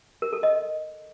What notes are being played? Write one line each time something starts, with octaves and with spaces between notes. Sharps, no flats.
A#4
A4
D#5